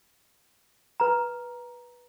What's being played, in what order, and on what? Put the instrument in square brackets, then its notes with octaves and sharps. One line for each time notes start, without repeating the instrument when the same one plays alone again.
[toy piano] B4 A#5